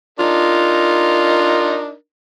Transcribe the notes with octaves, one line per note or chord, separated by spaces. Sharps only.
D4 D#4 F4 A#4